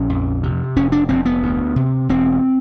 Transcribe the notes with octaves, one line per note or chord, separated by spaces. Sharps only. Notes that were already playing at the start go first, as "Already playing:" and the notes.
Already playing: A#1 C#4
F2
C3
F1 C#4
D4
F1 C4
B3
D2
C3
E1 C4